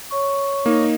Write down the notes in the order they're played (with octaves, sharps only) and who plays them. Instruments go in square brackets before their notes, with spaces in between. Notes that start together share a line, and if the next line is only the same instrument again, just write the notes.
[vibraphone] C#5 C#6
[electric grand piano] A#3 [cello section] D#4